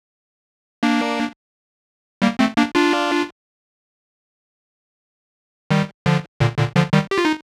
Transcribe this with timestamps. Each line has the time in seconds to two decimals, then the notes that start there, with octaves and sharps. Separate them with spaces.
0.83 A#3 D4
2.22 G3 A#3
2.39 A3 C4
2.57 A#3 D4
2.75 D4 F4
5.71 D#3 G3
6.06 D3 F3
6.40 A#2 D3
6.58 A#2 D3
6.76 D3 F3
6.93 D#3 G3
7.11 G4
7.18 F4
7.25 D#4